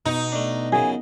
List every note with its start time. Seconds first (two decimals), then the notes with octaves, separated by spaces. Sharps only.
0.05 B2 D#4
0.32 A3 D4
0.72 F#2 C#3 G#4